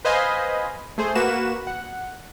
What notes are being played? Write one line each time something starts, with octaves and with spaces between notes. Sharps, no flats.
B4 C5 D#5 F5 G#5 B5
A3 G#4 C5
A#3 F#4 B4 E7
F#5